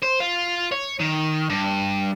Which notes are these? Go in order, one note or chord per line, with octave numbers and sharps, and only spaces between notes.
C5
F4
C#5
D#3
G2